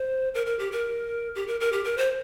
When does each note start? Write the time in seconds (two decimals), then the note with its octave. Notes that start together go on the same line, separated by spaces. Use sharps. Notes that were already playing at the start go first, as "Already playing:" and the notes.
Already playing: C5
0.35 A#4
0.46 A#4
0.59 G4
0.72 A#4
1.35 G4
1.48 A#4
1.61 A#4
1.72 G4
1.84 A#4
1.98 C5